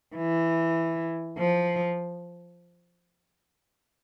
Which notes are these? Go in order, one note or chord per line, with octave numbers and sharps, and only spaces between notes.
E3
F3